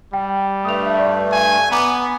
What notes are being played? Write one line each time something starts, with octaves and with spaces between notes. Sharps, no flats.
G3 G5
G2 A3 D#6 F7
D5
G#5
B3 G#5 A#5 D6